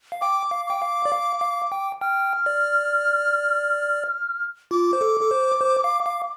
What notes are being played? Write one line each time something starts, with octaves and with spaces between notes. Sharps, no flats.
F5
G5 D6
F5
G5 D6
F5
D5
F5
F5
G5
G5 F6
D5
F4 D6
C5
A4
A4
C5
C5
F5
F5